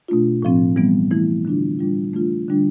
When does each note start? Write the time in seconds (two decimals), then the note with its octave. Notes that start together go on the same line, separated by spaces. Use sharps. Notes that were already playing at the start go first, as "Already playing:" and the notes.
0.08 B2 A3 D4 F4
0.43 A2 F3 C4
0.76 E3 G3 B3
1.11 E3 A3 E4
1.45 D3 G3 D4 F4
1.79 A2 G3 D4 F4
2.14 E3 A3 D4 F4
2.48 D3 G3 D4 F4